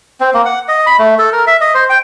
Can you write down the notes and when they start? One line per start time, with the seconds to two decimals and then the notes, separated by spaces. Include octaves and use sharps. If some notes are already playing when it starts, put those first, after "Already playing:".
0.20 C4
0.34 A#3
0.45 F#5
0.68 D#5
0.86 B5
0.99 A3
1.19 A4
1.32 A#4
1.47 E5
1.61 D#5
1.74 C5
1.89 G5